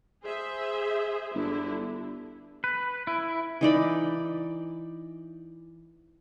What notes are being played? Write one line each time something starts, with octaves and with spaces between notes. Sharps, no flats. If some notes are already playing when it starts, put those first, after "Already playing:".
G#4 C5 E5
G1 D3 E4
B4
E4
E3 D#4 D5 B5